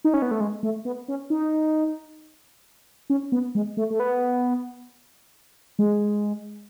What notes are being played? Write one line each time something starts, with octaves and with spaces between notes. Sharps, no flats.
D#4
C#4
B3
A3
G#3
A3
B3
C#4
D#4
C#4
B3
G#3
A3
A3
B3
G#3